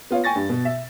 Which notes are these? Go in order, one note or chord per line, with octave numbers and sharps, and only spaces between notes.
B3 F4 C#5
G5 G#5 C#6 A6 A#6
G2
B2
E5